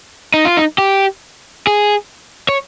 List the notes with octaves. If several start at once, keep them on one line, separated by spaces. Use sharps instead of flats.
D#4
F4
D#4
G4
G#4
C#5